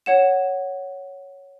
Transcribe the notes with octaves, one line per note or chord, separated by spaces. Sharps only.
C#5 F#5 E7